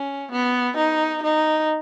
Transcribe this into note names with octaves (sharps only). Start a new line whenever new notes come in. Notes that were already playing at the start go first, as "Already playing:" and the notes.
Already playing: C#4
B3
D#4
D#4